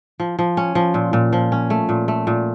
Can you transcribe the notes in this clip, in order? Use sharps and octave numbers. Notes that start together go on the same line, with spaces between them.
F3
F3
C#4
F3
A#2
A#2
F3
C#4
A3
A#2
A3
A#2